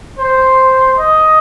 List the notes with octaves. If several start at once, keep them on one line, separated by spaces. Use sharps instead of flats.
C5
D#5